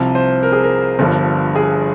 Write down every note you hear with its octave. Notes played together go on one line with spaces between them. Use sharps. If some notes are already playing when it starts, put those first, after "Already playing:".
Already playing: C2 C3 F3
C5
A#4
G#4
A#4
G1 G2 F3
G#4